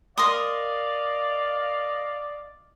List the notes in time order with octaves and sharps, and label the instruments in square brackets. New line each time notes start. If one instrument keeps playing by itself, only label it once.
[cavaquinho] A#4 C6 D#6 [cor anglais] D5 [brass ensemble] D#5 F5